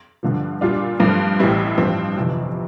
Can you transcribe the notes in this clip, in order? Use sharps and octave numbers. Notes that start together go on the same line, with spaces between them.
G2 D3 F3
A#2 G3 D4 F4
G2 F3 A3 C4 F4
A1 A2 G3 C4 E4
G2 F3 C4
G1 F2 C3 E3